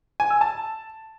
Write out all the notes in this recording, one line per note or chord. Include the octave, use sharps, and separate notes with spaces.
G#5
E6
A5